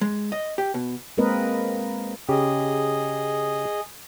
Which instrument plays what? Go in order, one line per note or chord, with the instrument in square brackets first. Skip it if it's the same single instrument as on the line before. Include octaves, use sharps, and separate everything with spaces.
[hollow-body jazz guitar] G#3
D#5
G4
B2
[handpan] G#3 A#3 C4 A#4 B4 D#5
[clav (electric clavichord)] C#3 G4 [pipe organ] G#4 D#5